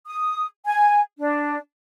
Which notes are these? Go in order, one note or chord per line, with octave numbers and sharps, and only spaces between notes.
D#6
G#5
D4